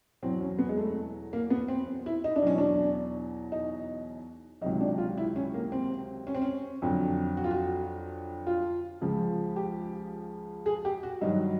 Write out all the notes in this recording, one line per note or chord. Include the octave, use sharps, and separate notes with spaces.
E2 B2 F#3 C4
C#4
B3
G#3
A3
A#3
B3
C4
E4
D#4
D4
E2 B2 F#3 C#4
D4
D#4
C#2 C3 D#3 F#3 D#4
D4
F4
E4
C#4
A#3
C4
C#4
C4
C#4
F2 D3 F#3
F#4
F4
F#4
F4
C#2 C#3 F3
G4
G#4
G4
F#4
G2 D#3 F#3 D#4